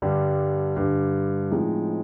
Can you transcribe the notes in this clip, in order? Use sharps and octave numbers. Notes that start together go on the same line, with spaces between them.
G2 D3 G3
G2 D3 G3
A2 F3 G#3 C4 D#4